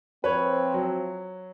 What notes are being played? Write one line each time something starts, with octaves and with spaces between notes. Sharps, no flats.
F3 C4 B4 C#5
F#3